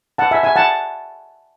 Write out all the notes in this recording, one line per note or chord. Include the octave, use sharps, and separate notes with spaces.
F#5 A5
E5 G#5
E5 G#5
F#5 A5